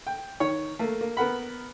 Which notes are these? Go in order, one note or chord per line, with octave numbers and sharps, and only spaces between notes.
G5
D#3 C#5
A3 A#3
A#3
B3 A#4 F#5 B5